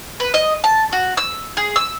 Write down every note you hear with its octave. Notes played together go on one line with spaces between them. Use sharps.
B4
D#5
A5
F#4
E6
G#4
E6